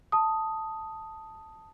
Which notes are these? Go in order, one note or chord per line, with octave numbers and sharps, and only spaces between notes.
A5 D#6